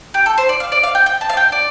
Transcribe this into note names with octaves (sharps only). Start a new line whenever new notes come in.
G4
A4
C5
D5
F5
D5
F5
G5
G5
A5
F5
G5
D5